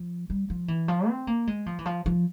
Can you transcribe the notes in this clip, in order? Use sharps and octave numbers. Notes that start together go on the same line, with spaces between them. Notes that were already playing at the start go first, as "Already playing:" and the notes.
Already playing: F3
G3
F3
E3
F3
C4
A#3
G#3
F3
E3
F3
F3